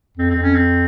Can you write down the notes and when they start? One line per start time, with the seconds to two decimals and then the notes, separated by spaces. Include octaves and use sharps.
0.18 F2 C4
0.30 C4
0.36 F2
0.42 C#4
0.54 C4